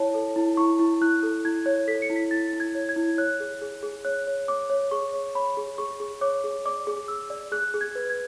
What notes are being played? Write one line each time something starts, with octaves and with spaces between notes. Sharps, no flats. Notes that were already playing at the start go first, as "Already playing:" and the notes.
Already playing: E4 C#5 A5
A4
E4
E4 C#6
E4
E4 F#6
A4
E4 G#6
C#5
A4 B6
C#7
E4
B6
E4 A6
E4
G#6
C#5
G#6
E4
C#5 F#6
G#4
G#4
G#4
C#5 F#6
C#5
C#5 D6
C#5
G#4 C#6
C#5
C#5 B5
G#4
G#4 C#6
G#4
C#5 D6
G#4
D5 D6
G#4
G#4 E6
D5
G#4 F#6
G#4
G#6
B4
G#6